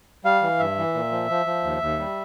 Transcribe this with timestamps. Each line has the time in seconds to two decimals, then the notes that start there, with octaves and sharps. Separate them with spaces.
0.25 G3 F5
0.42 E3
0.59 G2 E5
0.78 E3
0.94 A#2
1.11 F3
1.30 F3
1.46 F3
1.63 D#2
1.82 D#2
1.99 G3